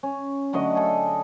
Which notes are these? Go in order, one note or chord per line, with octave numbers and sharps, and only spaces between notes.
C#4
D3 F#3 A3 D#5
G#4 A4